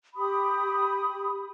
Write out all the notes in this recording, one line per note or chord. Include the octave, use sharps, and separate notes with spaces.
G4 B5 D#6